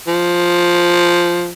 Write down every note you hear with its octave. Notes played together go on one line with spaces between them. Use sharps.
F3